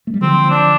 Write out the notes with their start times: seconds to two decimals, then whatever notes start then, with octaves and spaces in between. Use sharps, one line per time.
0.07 A3
0.14 G3
0.21 D3 F3 C4
0.50 D4